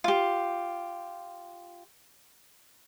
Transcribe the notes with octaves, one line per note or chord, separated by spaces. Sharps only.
F4 G4